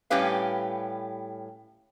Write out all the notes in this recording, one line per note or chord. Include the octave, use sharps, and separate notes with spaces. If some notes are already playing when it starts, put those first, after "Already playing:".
A2 G3 C#4 G4 B4 F5